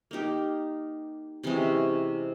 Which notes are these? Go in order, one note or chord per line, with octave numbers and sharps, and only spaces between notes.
A#3 D#4 G4
C3 E3 G#3 C#4